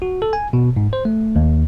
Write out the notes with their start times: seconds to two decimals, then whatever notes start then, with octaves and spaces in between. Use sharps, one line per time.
0.02 F#4
0.22 A4
0.33 G#5
0.53 B2
0.76 G#2
0.93 C5
1.05 A3
1.36 D#2